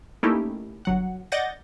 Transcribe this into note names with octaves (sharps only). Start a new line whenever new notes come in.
A3 A#3 C#4 D#4 E4 G4
G1 F#3 F#5
D5 D#5 F#5 G6 A6 A#6